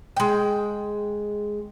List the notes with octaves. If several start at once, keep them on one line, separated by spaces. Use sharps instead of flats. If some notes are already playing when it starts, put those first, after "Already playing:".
G#3 G5